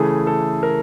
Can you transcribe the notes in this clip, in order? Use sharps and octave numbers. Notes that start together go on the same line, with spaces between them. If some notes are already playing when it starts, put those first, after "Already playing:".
Already playing: C#3 E3 A3 G#4
A4
A#4